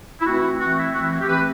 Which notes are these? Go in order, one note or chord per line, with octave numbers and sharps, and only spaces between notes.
E4
E3 A3 C4 F#4
E3 A3 C4 F#4
E4
E3 A3 C4 F#4
E4
F#4
G4
E3 A3 C4 B4